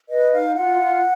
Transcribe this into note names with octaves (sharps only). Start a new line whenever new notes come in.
B4 D#5
D#4 F5
F4 F#5
F4